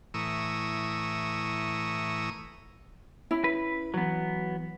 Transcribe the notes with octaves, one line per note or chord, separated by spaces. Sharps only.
A2 E3 A#5 C#6 D#6 E6
C#4 E4 B5
B4
E3 F#3 B3